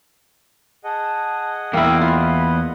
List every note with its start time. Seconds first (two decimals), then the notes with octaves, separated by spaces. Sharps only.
0.84 G#4 D#5 F#5 A5
1.73 E2 A#3 E4 G5 F6
2.01 F4 B5